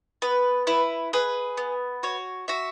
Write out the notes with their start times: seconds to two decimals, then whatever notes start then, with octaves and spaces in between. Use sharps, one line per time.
0.22 B3 B4
0.67 E4 B4
1.13 G#4 B4
1.57 B3
2.03 F#4 C#5
2.48 F#4 E5